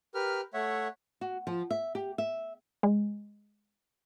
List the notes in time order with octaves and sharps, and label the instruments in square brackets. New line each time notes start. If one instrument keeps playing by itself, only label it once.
[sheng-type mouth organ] G4 A#4 B4 F6
A3 C#5 E5 F#5
[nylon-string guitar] F#4
F3
E5
G4
E5
[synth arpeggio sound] G#3